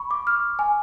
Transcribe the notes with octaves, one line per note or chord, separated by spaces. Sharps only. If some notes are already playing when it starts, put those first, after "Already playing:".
Already playing: B5 C#6
D6
F6
G#5